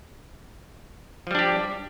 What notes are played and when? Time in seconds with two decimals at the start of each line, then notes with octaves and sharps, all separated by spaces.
1.27 F3
1.31 G3
1.35 D4
1.39 G4